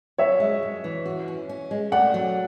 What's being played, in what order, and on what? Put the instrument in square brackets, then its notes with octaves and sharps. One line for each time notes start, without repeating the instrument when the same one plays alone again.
[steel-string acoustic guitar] F#2 [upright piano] C#5 E5
[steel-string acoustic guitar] G#3
F#2
E3
F#4
C#4
C#4
G#3
[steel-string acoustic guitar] A3 [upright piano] D5 F#5
[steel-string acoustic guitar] F#3